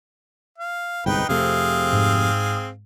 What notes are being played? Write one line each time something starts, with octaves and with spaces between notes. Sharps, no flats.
F5
G1 C2 G#2 D#4 B4 G5
F2 C3 A3 C4 G#4 F5
G#2